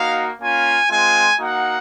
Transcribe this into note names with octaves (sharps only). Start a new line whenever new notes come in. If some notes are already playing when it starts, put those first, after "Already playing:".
Already playing: A#3 D#4 F#4 F5
A#3 C#4 F4 G#5
G#3 C4 F4 G#5
A#3 D#4 F#4 F#5